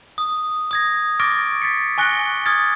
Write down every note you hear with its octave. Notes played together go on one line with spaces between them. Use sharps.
D#6
D#6 G#6 A#6
C#6 D6 F6 A6 A#6 D7
A6 B6 C#7
G#5 C#6 F#6 A#6 C#7 G7
D#6 F6 G#6 A6